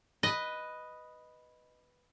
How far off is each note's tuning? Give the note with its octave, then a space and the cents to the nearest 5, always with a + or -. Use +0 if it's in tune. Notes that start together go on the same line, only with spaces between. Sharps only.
B4 +0 D#5 +0